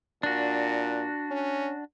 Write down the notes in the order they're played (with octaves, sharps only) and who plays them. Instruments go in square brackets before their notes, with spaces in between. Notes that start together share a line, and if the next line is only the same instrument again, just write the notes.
[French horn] A#2 [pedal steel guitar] D4 F#4
[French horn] C#4